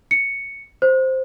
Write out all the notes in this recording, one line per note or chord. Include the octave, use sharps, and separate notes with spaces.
C#7
C5